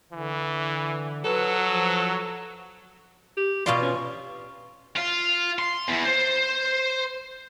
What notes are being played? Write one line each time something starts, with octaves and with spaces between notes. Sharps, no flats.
D3 E3
F#3 A4 B4
F3
G4
B2 F4 D5 C6
C#4
F4
C6
E2
C5